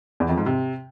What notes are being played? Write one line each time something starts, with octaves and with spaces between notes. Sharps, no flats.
E2
F2
G#2
C3